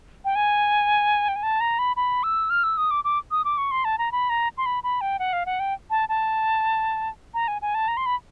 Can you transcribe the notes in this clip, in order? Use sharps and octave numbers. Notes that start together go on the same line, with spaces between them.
G5
G#5
G5
G#5
A5
A#5
B5
B5
E6
F6
E6
D#6
D6
D6
D#6
D6
C#6
C6
A5
A#5
B5
A#5
C6
B5
B5
G5
F#5
F5
F#5
G5
A5
A5
A#5
G#5
G#5
A5
A#5
C6
B5